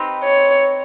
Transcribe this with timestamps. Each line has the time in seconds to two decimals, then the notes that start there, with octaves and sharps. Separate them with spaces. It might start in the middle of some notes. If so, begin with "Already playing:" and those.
Already playing: C4 D#4 G4 B4
0.24 C#5